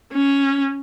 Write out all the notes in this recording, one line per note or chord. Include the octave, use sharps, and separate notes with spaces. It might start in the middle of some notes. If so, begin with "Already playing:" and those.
C#4